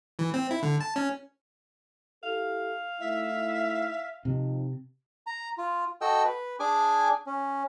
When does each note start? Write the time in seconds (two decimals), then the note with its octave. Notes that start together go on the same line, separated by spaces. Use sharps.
0.19 E3
0.34 C4
0.51 E4
0.63 D3
0.81 A5
0.96 C#4
2.23 E4 G4 A4 F5
3.00 A3 D#4 E4 E5
4.25 C3 F3 C4 D#4
5.27 A#5
5.58 F4
6.01 F#4 A4 D#5 G5 E6
6.25 B4
6.60 D4 G#4 G#5 D6
7.26 C#4